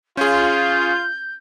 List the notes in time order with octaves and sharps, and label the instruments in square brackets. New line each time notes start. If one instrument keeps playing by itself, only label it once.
[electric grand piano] C#4 G#4 [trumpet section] F4 [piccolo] G6